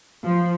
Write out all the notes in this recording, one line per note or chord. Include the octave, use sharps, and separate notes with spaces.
F3